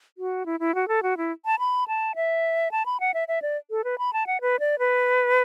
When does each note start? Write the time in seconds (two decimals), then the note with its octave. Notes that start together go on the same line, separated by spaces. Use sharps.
0.18 F#4
0.46 E4
0.60 E4
0.75 F#4
0.88 A4
1.03 F#4
1.17 E4
1.46 A5
1.59 B5
1.88 A5
2.16 E5
2.72 A5
2.86 B5
3.00 F#5
3.14 E5
3.28 E5
3.42 D5
3.71 A4
3.84 B4
3.98 B5
4.13 A5
4.27 F#5
4.41 B4
4.60 D5
4.79 B4